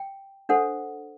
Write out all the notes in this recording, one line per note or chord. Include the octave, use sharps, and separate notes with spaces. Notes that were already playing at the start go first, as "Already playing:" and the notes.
Already playing: G5
D4 A4 C5 F#5